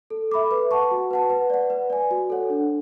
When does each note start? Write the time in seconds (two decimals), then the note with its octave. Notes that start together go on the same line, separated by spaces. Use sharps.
0.10 A4
0.31 E5 B5 D6
0.51 B4
0.71 F#5 A5 C#6
0.91 F#4
1.11 B4 F#5 A5
1.30 B4
1.50 D5 F#5
1.70 B4
1.90 D5 G#5
2.11 F#4
2.30 A4 C#5 F#5
2.50 D4